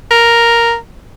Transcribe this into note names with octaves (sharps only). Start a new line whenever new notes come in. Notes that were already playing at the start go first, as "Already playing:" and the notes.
A#4